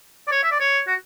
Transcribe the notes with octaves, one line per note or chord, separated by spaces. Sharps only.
D5
C#5
E5
D5
C#5
F#4